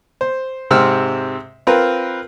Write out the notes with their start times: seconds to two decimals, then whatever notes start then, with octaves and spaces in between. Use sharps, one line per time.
0.21 C5
0.71 G#2 C3 C4 E6 F6
1.67 C4 F4 A#4 B4